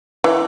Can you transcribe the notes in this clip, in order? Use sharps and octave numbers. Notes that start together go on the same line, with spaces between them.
E3